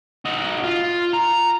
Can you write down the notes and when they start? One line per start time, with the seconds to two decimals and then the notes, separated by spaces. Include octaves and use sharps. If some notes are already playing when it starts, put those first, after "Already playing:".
0.25 D#4 F#4
0.63 F4
1.14 A#5